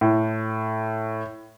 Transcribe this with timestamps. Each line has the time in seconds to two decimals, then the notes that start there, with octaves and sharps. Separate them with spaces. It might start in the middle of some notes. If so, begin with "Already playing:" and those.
0.01 A2